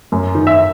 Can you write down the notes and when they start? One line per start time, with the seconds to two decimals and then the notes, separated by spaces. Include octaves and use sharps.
0.12 F#2
0.35 D#3
0.47 E5